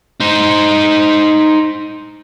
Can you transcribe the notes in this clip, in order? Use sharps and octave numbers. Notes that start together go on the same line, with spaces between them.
D#4 C5